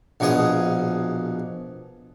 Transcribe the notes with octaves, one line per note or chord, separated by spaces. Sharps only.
A#1 B2 F3 G#4 D#6